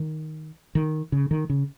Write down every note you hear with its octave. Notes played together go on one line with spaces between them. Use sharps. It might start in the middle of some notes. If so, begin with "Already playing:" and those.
Already playing: D#3
D#3
C#3
D#3
C#3